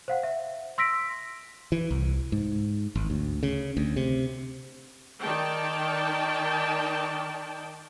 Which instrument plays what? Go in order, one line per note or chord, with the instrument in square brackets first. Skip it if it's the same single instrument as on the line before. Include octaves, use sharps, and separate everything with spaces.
[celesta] C5 F5 F#5
E5
C6 E6 A#6 B6 D7
[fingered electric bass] E3
C2
G#2
G#1
D2
C#3
D2
C3
[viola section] D#3 D5 G5 A5